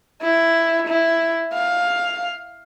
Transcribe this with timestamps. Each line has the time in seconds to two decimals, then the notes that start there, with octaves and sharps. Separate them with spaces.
0.22 E4
0.87 E4
1.54 F5